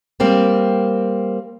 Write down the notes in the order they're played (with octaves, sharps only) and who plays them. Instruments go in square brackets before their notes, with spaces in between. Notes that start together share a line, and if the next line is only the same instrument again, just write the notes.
[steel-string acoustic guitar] G3 A#3 C4